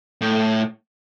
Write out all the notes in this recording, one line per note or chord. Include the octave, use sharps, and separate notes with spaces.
A2